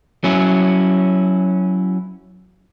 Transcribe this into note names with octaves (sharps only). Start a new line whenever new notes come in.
F#3 C#4 E4